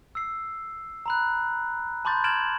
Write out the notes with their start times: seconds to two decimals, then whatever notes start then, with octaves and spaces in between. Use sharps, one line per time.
0.15 E6 C7
1.06 A#5 B5 F#6
2.05 A5 B5 C6 D6 G6 A6
2.24 F6 G#6 A6 D7 E7 F#7